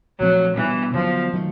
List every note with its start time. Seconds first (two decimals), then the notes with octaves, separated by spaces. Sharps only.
0.19 A#2 F3 F#3 A3 C4
0.57 B2 E3 G3 B3 D4
0.94 D3 F3 F#3 B3
1.33 D#3 F#3 A3